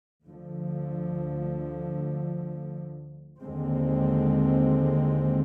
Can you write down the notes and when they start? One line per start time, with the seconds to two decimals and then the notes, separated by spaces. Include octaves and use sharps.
0.24 D2 D3 F3
3.41 D#2 D3 G#3 C4